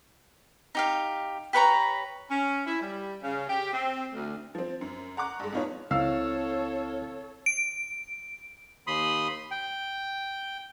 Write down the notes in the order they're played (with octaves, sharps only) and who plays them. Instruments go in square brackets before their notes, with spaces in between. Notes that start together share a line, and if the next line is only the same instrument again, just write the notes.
[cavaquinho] D#4 G4 F5
G4 B4 C#5 A#5
[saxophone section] C#4
E4
G3
C#3
G4
C4
D2
[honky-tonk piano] F3 C4
F#2
F#5 A#5 C#6 D6 F#6
G2 G#3
F2 B2 D#4 F4 B4 C#5
[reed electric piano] C#2 [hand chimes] C4 E4 [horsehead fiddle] A4 C#5 [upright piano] F5 E6
[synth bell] D7
[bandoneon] D#2 B5 C6 D#6
G5